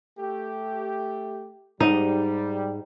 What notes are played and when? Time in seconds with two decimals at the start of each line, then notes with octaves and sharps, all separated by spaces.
0.18 A3 G4
1.80 G#2 G3 D#4